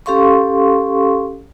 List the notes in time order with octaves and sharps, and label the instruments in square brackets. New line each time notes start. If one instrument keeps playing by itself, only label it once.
[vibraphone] C#4 G4 A4 F5 C6 C#6